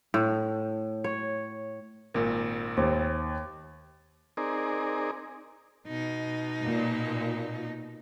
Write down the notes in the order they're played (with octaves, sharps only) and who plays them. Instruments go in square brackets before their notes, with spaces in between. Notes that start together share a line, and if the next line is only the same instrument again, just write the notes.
[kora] A2
C#5
[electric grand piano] G#1 A#2 [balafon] A#4
[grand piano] D#2 [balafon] C5
[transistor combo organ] C4 D#4 G#4 A#4 D5
[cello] B2 D#4
[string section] A#2